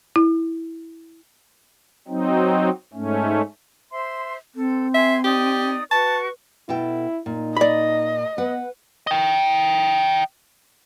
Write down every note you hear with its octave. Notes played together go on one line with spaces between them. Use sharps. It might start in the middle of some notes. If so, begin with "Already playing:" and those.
E4
F#3 C4 D#4
G#2 A3 C#4
C5 E5 C6
C4 A4
G#4 E5 G#5 C6
D#4 G4 D5 D#6
F#4 B4 A5 C#6
B2 E4 A4 G5
A#2 D#4
D5 D#5 B5
B3 B4 F#5
D#5 G5